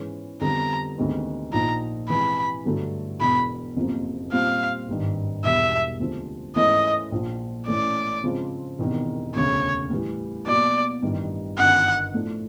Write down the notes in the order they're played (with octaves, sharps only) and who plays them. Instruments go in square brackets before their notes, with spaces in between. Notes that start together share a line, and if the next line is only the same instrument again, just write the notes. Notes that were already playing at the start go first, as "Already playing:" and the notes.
Already playing: [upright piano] G#2 E3 G#3 C#4
[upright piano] F2 D3 G3 B3 [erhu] A#5
[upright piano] D2 C3 D#3 G#3 B3
[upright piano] A#1 A#2 F3 A#3 D#4 [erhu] A#5
[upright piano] C3 E3 G#3 [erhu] B5
[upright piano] G2 D3 F#3 A3
[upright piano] E1 E2 B2 [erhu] B5
[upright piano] F#1 F2 C3 F3 A#3
[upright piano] A#2 G3 C4 F4 [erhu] F5
[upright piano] G#1 G2 D#3
[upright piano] E1 E2 B2 G3 [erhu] E5
[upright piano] D2 C3 F3 G#3 C4
[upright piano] G#2 E3 A3 C#4 E4 [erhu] D#5
[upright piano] A#1 A#2 F3
[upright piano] A1 A2 E3 A3 C#4 [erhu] D5
[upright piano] C#3 F3 G#3 C4 F4
E1 E2 C3 D#3
[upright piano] E1 D2 C#3 [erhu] C#5
[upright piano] A2 E3 G3
[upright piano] B2 F#3 A#3 [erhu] D5
[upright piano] A1 G2 D#3 G3
[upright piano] G1 F#2 D#3 [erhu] F#5
[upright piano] A2 F3 A3 D4